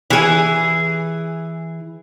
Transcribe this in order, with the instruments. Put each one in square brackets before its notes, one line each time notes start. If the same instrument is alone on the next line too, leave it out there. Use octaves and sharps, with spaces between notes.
[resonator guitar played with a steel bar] E3 G#4